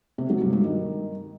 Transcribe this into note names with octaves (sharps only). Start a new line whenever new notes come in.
C3
F#3
G2
G2
D#3